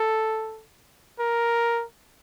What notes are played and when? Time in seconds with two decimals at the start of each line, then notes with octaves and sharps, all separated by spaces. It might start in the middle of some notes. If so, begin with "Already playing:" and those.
Already playing: A4
1.19 A#4